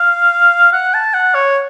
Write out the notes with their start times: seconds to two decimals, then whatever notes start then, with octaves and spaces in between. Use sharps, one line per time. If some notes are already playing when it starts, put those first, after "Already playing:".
Already playing: F5
0.73 F#5
0.94 A5
1.14 F#5
1.35 C#5